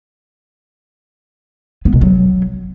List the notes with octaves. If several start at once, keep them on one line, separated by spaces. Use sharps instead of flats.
B3
B2
F#3